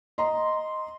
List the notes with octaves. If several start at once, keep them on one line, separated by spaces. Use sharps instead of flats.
D#5 A#5 C6